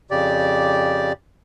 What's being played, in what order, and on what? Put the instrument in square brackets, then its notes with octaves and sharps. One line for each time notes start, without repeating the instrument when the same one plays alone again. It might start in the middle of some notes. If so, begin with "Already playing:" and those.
[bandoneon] F2 C#3 G4 D5